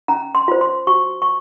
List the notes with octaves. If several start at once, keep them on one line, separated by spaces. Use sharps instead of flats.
C#4 A#5
C6
F4 C5
C6
F#4 C#6
C#6